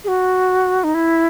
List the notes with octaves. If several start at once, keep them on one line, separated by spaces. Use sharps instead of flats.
G#4
F#4
D#4
E4